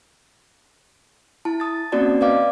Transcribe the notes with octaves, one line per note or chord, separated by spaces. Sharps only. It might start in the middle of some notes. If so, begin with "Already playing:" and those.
E4 A5
D#6 A6
A#3 C4 C#4 F#4 D5 A5
B4 D5 D#5 F5 D6